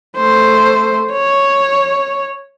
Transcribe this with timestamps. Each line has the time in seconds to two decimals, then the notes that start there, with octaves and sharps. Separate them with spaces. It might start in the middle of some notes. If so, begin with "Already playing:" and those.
0.16 A3 C5
1.12 C#5